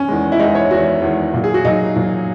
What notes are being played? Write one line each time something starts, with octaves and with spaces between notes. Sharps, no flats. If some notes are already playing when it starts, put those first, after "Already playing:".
Already playing: C#4
E2 D#3 G#3
E4
E2 D#3 G#3 D#4
C#5
E2 D#3 G#3 F#4
E2 D#3 G#3
A#2 F#3
G#4
F#4
A#2 F#3 D#4
A#2 F#3